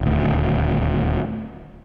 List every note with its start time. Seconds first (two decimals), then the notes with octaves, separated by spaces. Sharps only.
0.01 D#1 D2